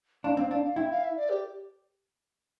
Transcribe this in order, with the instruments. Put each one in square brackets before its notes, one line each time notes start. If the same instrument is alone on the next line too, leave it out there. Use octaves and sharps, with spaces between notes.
[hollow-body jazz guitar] D4 [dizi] F5
[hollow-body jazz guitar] C4 [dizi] F5
[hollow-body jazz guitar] D4 [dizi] F5
[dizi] F5
[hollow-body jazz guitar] E4 [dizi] G5
[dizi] F5
E5
D5
G4